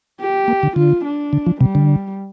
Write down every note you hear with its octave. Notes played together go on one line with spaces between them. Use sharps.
G4
A#3
D3
D3 F4
D4
D3
F3
C3 G3
D3